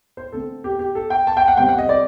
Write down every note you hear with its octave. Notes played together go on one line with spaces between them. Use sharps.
C5
D3 A3 C4 A4
G4
G4
A4
G5
A5
G5
F#5
C3 G3 C4 G5
F#5
D#5
D5